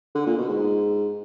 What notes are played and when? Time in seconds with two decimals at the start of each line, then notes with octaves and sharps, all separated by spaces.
0.15 D3
0.26 A#2
0.37 B2
0.49 G#2